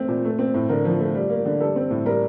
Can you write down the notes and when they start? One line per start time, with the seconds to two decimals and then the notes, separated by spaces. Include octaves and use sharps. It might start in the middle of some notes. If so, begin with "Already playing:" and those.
Already playing: A3 C4
0.08 A#2
0.25 A3
0.39 C4
0.54 A2
0.69 D3 A#4
0.85 F3
1.00 A3
1.14 G3
1.29 A#3
1.45 D3
1.60 G3 A4
1.76 C4
1.91 A2
2.05 G3 A#4